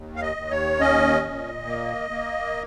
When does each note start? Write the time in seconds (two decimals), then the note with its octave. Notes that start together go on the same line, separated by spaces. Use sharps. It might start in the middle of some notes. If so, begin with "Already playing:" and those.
Already playing: D#2
0.16 F5
0.22 D#5
0.36 D#2
0.51 C#5
0.80 C#4 D#5
1.23 A#2
1.67 A#3
2.10 A#3